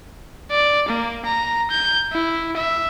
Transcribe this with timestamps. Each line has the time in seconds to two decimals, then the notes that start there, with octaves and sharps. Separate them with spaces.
0.51 D5
0.88 A#3
1.25 A#5
1.70 G6
2.12 E4
2.56 E5